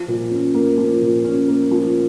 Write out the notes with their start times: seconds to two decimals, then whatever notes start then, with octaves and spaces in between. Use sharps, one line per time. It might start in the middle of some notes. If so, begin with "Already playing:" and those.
Already playing: F3
0.08 A#2
0.31 C#4
0.54 A#3
0.78 F3
1.02 A#2
1.24 C#4
1.48 A#3
1.71 F3